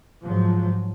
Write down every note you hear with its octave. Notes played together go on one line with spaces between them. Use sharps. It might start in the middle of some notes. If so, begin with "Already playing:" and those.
G#2 F3 F#3